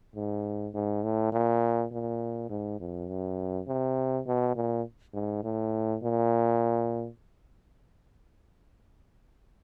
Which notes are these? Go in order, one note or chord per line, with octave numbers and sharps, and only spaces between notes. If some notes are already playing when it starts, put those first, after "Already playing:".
G#2
G#2
A2
A#2
A#2
G#2
F2
F#2
C3
B2
A#2
G#2
A2
A#2